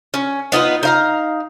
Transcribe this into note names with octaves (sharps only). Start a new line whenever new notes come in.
C#4
B3 D#4 F4 B4
D#4 F5 A#5